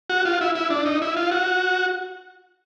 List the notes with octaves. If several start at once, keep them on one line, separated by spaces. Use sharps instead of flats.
F#4
F4
E4
E4
D4
D#4
E4
F4
F#4